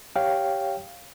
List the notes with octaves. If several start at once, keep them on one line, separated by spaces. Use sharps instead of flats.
G4 C#5 F5 G5